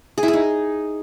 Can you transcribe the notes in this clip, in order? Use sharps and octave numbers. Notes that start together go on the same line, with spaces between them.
G#4
E4
G#4
D#4